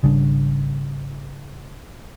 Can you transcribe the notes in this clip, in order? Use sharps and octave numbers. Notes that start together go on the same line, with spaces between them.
G#1 C#3 G3 D4